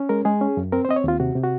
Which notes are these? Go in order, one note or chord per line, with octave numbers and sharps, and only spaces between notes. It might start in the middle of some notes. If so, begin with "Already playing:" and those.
Already playing: C#4
G#3 A#4
G#3 G#4
C#4
F#2
C4 A#4
C5
C4 D#5
C#5
D#2 F4
C3 F#4
C3
F#4